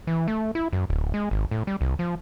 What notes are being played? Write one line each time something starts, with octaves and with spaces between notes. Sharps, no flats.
E3
A3
E4
F#2
D1
G#3
G#1
A2
G3
C2
F3